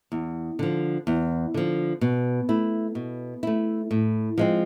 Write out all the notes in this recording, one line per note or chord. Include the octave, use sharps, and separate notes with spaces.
E2
D3 F3
E2
D3 F3
B2
A3 E4
B2
A3 E4
A2
F3 G#3 C4